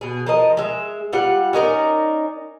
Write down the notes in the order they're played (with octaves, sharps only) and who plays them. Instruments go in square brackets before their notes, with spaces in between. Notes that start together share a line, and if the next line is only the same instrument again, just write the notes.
[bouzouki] B2 G#4
F3 A#4 D#5
G#3 E5
G3 F4 F#5
C#4 D#4 A#4 D5